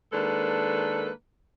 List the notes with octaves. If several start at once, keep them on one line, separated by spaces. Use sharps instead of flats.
D#3 G#3 A#3 D4 A4 B4